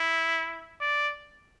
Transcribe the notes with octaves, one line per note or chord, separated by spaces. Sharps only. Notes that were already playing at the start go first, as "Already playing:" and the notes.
Already playing: E4
D5